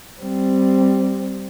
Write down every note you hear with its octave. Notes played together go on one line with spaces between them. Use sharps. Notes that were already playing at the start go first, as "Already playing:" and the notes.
G3 C4